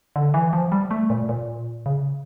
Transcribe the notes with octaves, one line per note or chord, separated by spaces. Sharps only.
D3
E3
F3
G3
A3
A#2
A#2
C#3